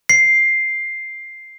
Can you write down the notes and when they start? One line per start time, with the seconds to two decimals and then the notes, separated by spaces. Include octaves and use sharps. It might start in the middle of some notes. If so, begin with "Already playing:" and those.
0.09 C7